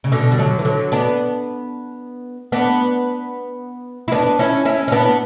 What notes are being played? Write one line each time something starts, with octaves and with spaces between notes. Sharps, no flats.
C#3
B2 D3
G3
D3 F#3
E3
D3 F#3
B3 D4
B3 D4
E4
B3 D4
C#4 E4
C#4 E4
C#4
B3 D4